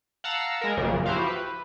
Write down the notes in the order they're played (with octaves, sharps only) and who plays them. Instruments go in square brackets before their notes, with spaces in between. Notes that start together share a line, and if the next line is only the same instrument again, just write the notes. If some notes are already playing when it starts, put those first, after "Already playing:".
[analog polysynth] F5 F#5 A5 A#5 E6
G#3 A#4
A#1 F#2 A#2 C#3
F3 E4 F#4 G4 C5 F5
B4